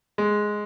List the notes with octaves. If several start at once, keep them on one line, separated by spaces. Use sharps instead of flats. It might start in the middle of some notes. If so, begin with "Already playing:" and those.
G#3